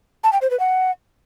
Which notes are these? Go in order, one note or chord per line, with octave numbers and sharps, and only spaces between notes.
A5
G5
C5
B4
F#5